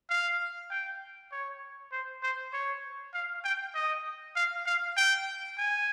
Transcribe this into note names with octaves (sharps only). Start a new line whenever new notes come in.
F5
G5
C#5
C5
C5
C#5
F5
G5
D#5
F5
F5
G5
G#5